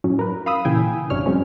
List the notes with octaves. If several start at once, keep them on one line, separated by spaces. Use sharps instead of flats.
F#2 A2 F#3 C#4
A#4 B4
F5 B5 D#6 E6
A#2 C#3 E3 G5 G#5
G#1 F#2 C3 D4 C#5 F6
F#3 G#3 C4 C#4